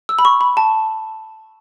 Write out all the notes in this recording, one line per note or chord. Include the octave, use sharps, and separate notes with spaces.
E6
B5
C#6
B5
A5